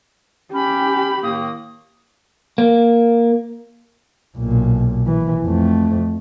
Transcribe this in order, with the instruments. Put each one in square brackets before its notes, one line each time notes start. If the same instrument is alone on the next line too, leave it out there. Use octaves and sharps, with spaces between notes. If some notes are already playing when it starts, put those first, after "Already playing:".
[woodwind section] C#4 [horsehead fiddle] G4 [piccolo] B5
[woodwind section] A2 D#3 A#3 [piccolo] D#6
[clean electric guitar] A#3
[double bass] B1 A#2
E3
F2 A3